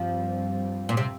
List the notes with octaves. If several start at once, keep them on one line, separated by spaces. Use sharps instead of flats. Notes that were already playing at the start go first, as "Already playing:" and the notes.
Already playing: G2 F3 G3 C4
A#2
C3